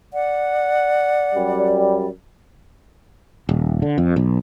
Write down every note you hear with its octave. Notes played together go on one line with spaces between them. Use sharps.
D5 F#5
F#2 G3
D#1
D3
F2
B1